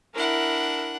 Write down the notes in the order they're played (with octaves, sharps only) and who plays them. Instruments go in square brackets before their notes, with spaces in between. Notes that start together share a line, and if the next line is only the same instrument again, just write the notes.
[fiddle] D4 F#5 [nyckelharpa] E4 A#4